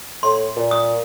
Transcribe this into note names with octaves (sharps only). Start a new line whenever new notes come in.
A2 C6
A#2
D#6